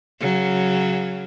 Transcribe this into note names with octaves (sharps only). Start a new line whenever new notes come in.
C#3 F#3